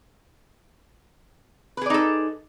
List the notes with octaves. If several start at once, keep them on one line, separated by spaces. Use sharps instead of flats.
D#4 G#4 A4 B4 D5